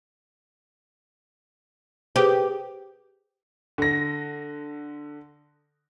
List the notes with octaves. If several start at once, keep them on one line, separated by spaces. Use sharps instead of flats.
G4 G#4 B4 C5
D3 A#6